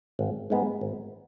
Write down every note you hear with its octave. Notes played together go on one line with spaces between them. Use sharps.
G#1
G#2 G#3 B3
G#1